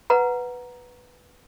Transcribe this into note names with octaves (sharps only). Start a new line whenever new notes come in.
B4 F#5 A#5